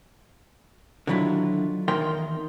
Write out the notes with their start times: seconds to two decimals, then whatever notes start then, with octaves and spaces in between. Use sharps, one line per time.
1.07 D3 D#3 F#3 E4 F4
1.88 E2 D#3 A#4 G5 C6